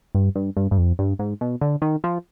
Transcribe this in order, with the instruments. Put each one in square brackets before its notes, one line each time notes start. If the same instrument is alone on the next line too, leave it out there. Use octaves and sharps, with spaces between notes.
[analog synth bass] G2
G2
G2
G2
F2
G2
G#2
B2
D3
D#3
F3